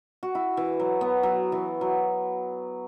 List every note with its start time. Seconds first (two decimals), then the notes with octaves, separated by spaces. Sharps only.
0.23 F#4
0.35 E4
0.57 E3
0.80 F#3
1.01 B3
1.23 F#3
1.52 E3
1.81 F#3